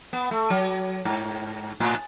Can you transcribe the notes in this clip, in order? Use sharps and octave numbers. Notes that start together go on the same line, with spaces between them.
B3
A3
F#3
G#2
A2